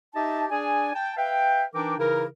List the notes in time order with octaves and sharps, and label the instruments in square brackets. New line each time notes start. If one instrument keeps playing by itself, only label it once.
[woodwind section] D#4 G4 D#5 E5 A5
D4 G#4 D5 G#5
G5 A5
B4 E5 F5 G5
E3 D4 D#4 A#4 G5 D6
C#3 E3 D#4 E4 A#4